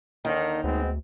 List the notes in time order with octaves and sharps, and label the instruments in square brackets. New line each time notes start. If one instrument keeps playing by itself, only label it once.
[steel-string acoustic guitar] D#2 D#4 [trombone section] D3 D#3
[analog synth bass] D2 [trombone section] G#3 B3 C4